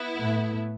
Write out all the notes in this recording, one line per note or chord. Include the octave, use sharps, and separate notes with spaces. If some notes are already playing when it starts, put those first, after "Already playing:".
Already playing: B3 E4
A2 A3